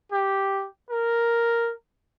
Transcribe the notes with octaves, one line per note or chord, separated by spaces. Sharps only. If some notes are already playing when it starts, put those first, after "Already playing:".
G4
A#4